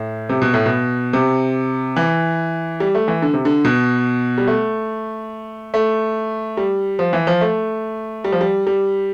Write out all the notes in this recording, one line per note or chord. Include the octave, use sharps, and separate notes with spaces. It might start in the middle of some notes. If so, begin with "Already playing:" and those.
Already playing: A2
C3
B2
A2
B2
C3
E3
G3
A3
E3
D3
C3
D3
B2
G3
A3
A3
G3
F3
E3
F3
A3
G3
F3
G3
G3